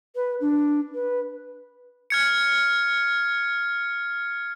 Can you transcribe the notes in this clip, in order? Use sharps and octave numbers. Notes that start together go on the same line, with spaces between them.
B4
D4
B4
F6 G#6 C#7